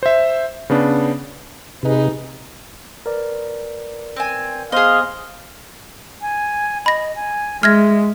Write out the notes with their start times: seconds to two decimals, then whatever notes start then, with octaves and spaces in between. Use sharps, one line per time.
0.03 C5 E5
0.70 C#3 B3 D4
1.83 C3 D#4 G#4 B4
3.06 A#4 B4 D5
4.16 C4 G#5
4.72 B3 G#4 C5 D#5 F5 C6
6.22 G#5
6.86 D#5 B5 A#6
7.16 G#5
7.63 G#3 E5 F6 G#6 A#6